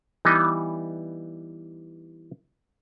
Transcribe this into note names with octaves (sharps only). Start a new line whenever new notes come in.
E3 G3 B3 D#4 D#5